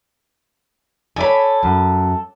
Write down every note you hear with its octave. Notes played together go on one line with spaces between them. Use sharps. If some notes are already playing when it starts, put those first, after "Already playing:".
A4 C#5 D5 G#5 B5
F#2